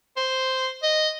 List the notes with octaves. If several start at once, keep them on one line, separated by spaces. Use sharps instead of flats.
C5
D#5